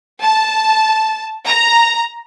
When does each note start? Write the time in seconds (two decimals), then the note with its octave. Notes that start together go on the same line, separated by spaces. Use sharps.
0.21 A5
1.46 A#5